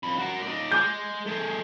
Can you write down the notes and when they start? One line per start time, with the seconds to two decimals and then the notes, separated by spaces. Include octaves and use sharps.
0.03 F2 B5
0.19 F#4 A#4
0.42 D#4 D5
0.72 G#3 G#4 D6 G6
1.26 A3 G#4